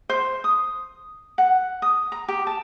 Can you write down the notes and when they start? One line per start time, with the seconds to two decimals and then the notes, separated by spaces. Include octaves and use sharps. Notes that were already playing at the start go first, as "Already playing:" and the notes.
0.09 C5
0.44 D#6
1.38 F#5
1.82 D#6
2.12 A#5
2.28 G4
2.47 A5